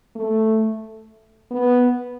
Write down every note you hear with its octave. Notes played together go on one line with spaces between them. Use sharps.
A3
B3